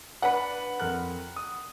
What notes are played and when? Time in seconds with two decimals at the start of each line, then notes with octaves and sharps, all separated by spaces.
0.22 D4 B4 F#5 B5
0.80 F2 A#4 F#6
1.36 D#6